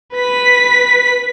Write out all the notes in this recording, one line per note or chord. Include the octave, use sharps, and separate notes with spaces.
B4 B6